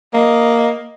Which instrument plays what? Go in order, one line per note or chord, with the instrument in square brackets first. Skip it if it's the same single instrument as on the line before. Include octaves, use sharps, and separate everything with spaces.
[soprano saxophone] A#3 [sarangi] D#5